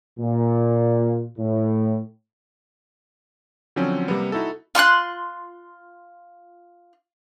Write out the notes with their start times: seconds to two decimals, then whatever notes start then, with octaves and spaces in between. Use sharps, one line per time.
0.19 A#2
1.39 A2
3.76 D3 F3 F#3 C4 C#4
4.08 C3 G3 A#3 B3
4.32 D#4 E4 F#4 A4
4.75 F4 C6 C#6 F#6